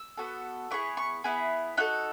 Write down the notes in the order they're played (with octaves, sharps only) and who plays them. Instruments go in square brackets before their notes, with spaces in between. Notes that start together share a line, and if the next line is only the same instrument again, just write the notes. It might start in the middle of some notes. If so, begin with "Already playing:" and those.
Already playing: [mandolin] E6
B3 F#4 A4
B3 E4 G#4 C#6
C#6
B3 E4 G#4
D#4 F#4 A4 F#6